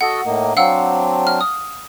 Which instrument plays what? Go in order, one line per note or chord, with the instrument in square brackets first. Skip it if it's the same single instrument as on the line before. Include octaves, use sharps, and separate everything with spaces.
[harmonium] F#4 A4 D#5 [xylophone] F#5
[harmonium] A2 A#3 D#4
[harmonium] F#3 C4 D4 [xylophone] F5 F#5 E6
[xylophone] F6
D#6